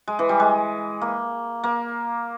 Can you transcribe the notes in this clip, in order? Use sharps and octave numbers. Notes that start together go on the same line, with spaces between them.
G#3
E3
G3
G#3
A#3
A#3